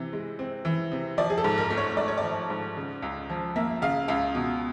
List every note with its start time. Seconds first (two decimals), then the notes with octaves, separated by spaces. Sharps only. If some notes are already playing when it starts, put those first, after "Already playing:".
Already playing: C3 E3
0.13 G#3
0.39 C4
0.65 E3
0.92 C3
1.18 F3 D5
1.30 G#4
1.38 A4
1.44 G#2
1.58 A#4
1.70 A3
1.77 C#5
1.97 G#2 D5
2.08 C#5
2.18 D5
2.23 F3
2.50 G#2
2.77 C#3
3.03 C#2
3.30 F3
3.56 A#3 E5
3.82 C#3 F5
4.08 C#2 F5
4.35 B2